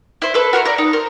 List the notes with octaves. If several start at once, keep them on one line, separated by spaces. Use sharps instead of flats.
E4 C5
A4 B4
F#4 A#4 C5 C#5
A#4 D5
D#4
A#4 C5